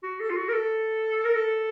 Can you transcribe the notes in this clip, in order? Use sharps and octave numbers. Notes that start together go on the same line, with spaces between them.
F#4
A4
F4
F#4
A#4
A4
A#4
A4